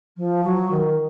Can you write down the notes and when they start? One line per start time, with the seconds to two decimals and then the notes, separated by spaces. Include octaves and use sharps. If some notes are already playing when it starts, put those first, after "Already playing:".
0.17 F3
0.43 F#3
0.70 D#3